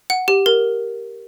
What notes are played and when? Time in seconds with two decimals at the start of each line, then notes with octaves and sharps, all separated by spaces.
0.10 F#5
0.28 G4
0.46 A#4